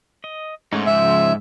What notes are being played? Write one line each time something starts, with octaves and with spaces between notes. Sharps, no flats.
D#5
G#2 A3 C#4 D#4
C#3 F3 E5